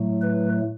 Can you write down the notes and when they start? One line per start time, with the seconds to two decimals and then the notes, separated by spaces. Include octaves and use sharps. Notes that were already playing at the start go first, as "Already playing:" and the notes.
Already playing: A2 F#3 A3
0.22 B4